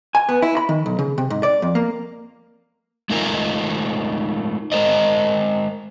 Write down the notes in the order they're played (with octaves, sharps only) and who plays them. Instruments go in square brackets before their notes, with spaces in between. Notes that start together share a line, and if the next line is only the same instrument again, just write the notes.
[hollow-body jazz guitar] G#5
B3
E4
B5
D#3
B1
C#3
C3
G#2
D5
F2
A#3
[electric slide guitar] G#3 A3 D#4 F4 A#4 G#5
G#3 A#4 C5 D#5